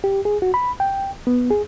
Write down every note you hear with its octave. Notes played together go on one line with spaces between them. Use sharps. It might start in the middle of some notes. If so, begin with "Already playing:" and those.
G4
G#4
F#4
B5
G5
B3
G#4